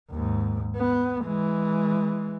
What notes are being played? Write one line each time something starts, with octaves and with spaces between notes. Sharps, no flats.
D#2 G#2
B3
E3 G#3